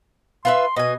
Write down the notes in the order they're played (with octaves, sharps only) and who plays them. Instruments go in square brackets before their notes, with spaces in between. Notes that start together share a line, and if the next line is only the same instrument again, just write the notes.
[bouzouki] F4 B4 E5 [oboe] C6
[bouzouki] B2 G#5 [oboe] D#5